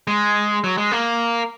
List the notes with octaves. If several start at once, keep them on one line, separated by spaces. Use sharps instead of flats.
G#3
F#3
G#3
A#3